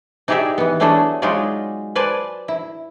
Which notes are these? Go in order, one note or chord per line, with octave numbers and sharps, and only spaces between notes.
D#4 E4 G4 G#4 D5 E5
E3 B3
F#3 A3 D4 E4 G#4 A4
F#3 G#3 D#4 F4 G#4 D5
B4 C5 D5 G#5 A5
E4